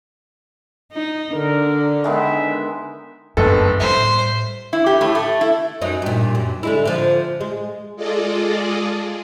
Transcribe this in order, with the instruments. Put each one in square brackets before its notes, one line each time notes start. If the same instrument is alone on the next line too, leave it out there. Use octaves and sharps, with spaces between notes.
[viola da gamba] D#4
[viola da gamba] D3 D4 [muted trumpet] A#4
[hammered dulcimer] D#3 G#3 B3 [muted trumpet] E5
[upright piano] F#1 B3 A4 [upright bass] G2
[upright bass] A2 G3 [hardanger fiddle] C5 [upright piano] E5
[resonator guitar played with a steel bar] E4
G4
A2
A3
E4
[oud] F#2 F#3 D#4
G2 A#2
F#2
D3 G#3 E4
D3 F3
G#3
[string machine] G#3 F4 G#4 A4 D5 D#5